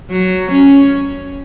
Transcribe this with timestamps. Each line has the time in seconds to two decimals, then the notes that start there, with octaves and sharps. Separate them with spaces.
0.11 F#3
0.52 C#4